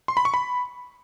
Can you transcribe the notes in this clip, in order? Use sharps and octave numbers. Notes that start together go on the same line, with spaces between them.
C6
B5
C#6
B5